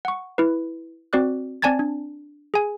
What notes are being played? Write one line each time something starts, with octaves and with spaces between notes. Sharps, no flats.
F#5 C#6
E4 B4
C4 F#4 D5 D6 F#6
C4 D5 G#5 A5 G#6 A6
D4
G#4 G#5